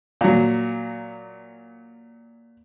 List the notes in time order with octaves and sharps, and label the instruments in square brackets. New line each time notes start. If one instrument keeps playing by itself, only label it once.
[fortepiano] A#2 F#3